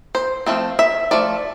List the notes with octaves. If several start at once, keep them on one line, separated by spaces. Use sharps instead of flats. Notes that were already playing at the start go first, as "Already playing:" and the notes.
C5
F3 A3 C4
E5
F3 A3 D5